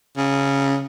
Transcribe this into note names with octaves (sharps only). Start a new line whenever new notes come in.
C#3